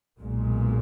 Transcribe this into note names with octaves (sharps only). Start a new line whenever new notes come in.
B1 A#2 G#3